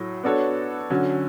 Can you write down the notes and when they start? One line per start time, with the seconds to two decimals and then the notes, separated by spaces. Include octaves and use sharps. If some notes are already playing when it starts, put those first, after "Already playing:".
Already playing: A2 F#3 A3
0.24 B3 D4 F#4 A4 C#5
0.90 D3 F#3 C#4